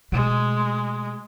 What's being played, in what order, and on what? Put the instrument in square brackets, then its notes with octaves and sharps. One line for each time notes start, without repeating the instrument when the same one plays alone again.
[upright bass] B2 A3 [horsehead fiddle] G#3